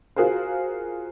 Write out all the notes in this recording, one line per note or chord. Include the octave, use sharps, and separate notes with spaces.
F4 F#4 G#4 A#4 C5